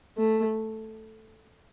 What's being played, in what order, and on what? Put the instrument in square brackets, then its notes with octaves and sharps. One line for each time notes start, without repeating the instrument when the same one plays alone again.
[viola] A3